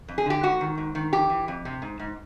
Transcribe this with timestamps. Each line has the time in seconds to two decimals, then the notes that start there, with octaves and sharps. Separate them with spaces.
0.08 F2
0.18 G#4
0.26 D3 G4
0.43 G#2 F#4
0.61 D#3
0.78 G#2
0.95 D#3
1.13 F2 G4
1.30 E3
1.48 F2
1.65 C3
1.82 G#2
1.99 G#2